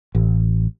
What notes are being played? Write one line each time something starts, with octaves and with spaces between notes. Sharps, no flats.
A1